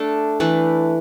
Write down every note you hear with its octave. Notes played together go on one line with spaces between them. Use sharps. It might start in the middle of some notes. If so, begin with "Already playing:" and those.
Already playing: A3 D4 A4
E3 A3 D4 B4